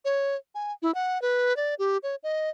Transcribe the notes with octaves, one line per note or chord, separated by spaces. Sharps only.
C#5
G#5
E4
F#5
B4
D5
G4
C#5
D#5